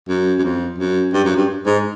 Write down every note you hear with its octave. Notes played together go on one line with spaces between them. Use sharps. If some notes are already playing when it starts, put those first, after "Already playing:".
F#2
F#2
F2
F#2
G2
F#2
G2
G#2